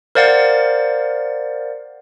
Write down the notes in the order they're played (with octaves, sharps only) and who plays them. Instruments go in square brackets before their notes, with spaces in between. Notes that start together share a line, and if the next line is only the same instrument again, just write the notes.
[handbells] A#4 C5 D5 F5 F#5 A6